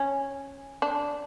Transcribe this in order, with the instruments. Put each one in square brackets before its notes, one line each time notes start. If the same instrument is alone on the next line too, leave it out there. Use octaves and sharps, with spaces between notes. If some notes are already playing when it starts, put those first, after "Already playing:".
Already playing: [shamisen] C#4
D4